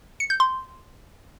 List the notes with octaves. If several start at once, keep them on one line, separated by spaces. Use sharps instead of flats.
C#7
G6
C6